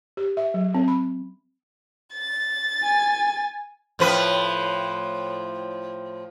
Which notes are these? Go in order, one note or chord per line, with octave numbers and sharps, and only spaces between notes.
G4
E5
F#3
C4
B5
A6
G#5
A2 F3 B4